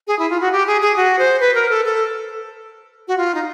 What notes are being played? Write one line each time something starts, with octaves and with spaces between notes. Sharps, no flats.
G#4
E4
F4
F#4
G4
G#4
G#4
F#4
C5
B4
A#4
A4
A4
F#4
F4
D#4